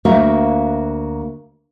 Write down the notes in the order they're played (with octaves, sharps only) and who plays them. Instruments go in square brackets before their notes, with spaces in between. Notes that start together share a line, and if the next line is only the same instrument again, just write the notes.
[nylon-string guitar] D2 A#3 F#4 A#4 E5 F5